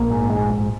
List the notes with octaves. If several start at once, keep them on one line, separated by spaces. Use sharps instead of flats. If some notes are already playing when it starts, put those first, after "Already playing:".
Already playing: A#1 A#3
G#2
A#1 G#3
G#2